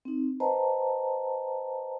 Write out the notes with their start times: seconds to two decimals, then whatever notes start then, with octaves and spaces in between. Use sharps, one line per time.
0.05 C4 D#4
0.40 B4 C5 D#5 G5 A5 A#5